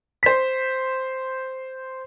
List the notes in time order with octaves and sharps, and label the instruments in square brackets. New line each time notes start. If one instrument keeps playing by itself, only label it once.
[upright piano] C5 B6